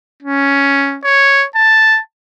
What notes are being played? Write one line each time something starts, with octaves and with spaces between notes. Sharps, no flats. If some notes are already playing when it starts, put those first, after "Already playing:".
C#4
C#5
A5